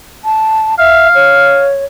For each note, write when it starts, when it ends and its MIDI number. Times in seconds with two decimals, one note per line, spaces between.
0.25 0.75 81
0.79 1.08 76
0.79 1.69 77
1.15 1.85 73